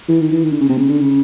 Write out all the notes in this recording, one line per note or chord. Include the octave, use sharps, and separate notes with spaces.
E3
D#3
E3
D#3
D3
C#3
C3
C#3
D3
C#3